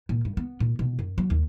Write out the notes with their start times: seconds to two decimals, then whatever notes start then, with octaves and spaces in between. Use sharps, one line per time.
0.09 A#2
0.25 G2
0.37 B3
0.60 A#2
0.79 B2
0.99 F#2
1.18 F#3
1.30 D#2